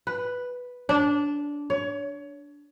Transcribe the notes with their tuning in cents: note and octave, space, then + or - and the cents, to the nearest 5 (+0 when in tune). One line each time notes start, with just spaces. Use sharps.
B4 +0
D4 -15
C#5 +25